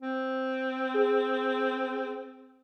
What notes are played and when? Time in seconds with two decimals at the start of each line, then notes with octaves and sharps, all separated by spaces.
0.01 C4
0.94 G#4